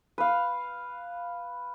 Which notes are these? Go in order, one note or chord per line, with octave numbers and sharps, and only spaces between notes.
B4 F5